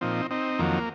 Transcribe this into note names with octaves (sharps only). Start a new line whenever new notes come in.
A#2 F3 C4 D#4
C4 D#4
F2 D#3 F#3 A#3